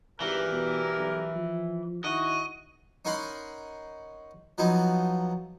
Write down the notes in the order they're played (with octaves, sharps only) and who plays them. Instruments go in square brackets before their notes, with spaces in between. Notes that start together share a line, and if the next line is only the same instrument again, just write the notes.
[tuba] G#1 [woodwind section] G2 G4 A#4 [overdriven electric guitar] E3
[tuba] B2
B1
F3
[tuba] D#3 [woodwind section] E4 F#4 [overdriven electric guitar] D#5
[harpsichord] C#4 D#4 A#4 F#5 B5 C6
F3 F#3 B3 D#4